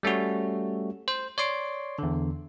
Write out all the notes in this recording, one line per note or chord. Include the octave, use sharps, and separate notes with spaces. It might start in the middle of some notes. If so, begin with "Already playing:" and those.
G3 A3 C#4 F#4
C5
C#5 D5 C6 D6
E2 D3